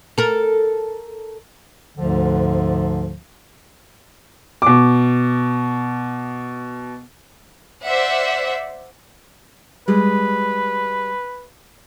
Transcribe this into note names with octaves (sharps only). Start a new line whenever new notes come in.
A4 A#4
D2 G#2 D3 F3
B2 D6
C5 D5 E5 F#5
G3 G#3 G#4 B4